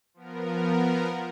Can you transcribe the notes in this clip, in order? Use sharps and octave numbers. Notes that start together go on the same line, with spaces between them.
F3 B3 A#4